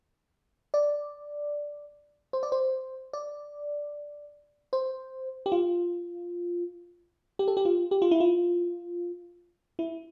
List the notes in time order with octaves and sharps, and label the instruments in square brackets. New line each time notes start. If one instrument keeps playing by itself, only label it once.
[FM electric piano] D5
C5
D5
C5
D5
C5
G4
F4
G4
A4
G4
F4
G4
F4
E4
F4
E4